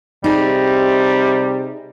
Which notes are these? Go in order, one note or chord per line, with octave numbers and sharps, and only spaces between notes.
C3 G3 D#4 G#4